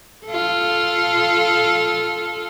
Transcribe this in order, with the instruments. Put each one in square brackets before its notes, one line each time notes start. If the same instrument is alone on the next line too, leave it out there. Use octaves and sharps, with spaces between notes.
[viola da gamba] F4 A4